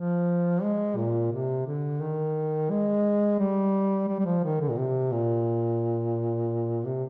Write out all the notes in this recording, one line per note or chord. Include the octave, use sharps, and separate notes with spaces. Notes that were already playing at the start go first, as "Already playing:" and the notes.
Already playing: F3
G#3
A#2
C3
D3
D#3
G#3
G3
G3
G3
F3
D#3
D3
A#2
C3
A#2
C3